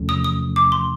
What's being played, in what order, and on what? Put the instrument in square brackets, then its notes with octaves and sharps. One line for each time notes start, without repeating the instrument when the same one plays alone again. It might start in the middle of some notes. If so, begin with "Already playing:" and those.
Already playing: [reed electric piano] E2 C3 F3 A3 C#4
[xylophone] D#6
D#6
D6
C6